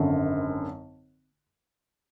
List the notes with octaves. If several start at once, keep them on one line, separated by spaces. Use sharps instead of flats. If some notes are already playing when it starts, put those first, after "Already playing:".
Already playing: G#1 F#2 D3